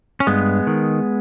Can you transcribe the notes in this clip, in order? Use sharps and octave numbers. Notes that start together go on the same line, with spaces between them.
C#4
G2 G#3 B3
D#3